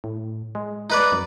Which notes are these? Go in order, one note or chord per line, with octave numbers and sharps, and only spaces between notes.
A2
G#3
D#4 B4 D5
F#2